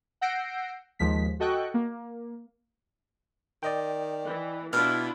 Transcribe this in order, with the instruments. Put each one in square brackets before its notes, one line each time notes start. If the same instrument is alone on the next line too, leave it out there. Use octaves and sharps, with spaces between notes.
[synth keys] F#5 E6 G6 A#6 C7 D7
D#2 F3 G#3 B6
F#4 A4 D#5 G5 C#6 F#6
A#3
[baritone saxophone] D#3 [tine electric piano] D5 D#5 G5
[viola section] E3
[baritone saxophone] B2 [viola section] D4 E4 F4 [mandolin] F6